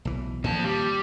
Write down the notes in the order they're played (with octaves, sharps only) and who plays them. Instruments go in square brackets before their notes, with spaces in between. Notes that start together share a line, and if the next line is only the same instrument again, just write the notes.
[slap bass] B1 E3
[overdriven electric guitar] F2 A5 [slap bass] A#2 D#3 F3
[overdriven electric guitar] G3